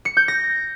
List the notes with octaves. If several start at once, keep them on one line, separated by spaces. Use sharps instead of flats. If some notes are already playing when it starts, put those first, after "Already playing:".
C#7
G6
A#6